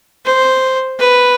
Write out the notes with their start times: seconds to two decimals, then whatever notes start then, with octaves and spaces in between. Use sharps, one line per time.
0.25 C5
0.99 B4